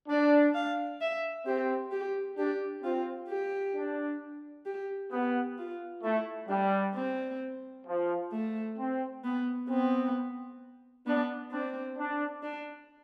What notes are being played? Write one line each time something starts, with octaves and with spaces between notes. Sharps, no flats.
D4 D5
F5
E5
C4 G4
G4
D4 G4
C4 F4
G4
D4
G4
B3 G4
F4
A3 E4
G3 D4
C4
F3
A3
C4
B3
B3 C4
B3 D4
C4 D4
D4
D4